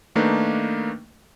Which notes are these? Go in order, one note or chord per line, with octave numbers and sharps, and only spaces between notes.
D#3 A3 A#3 D4 D#4 B4